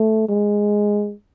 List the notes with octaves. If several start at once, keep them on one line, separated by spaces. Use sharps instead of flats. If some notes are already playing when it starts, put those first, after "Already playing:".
Already playing: A3
G#3